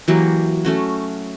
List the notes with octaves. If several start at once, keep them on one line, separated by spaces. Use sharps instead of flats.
E3 F#3 A#3 G4
A3 C#4 F#4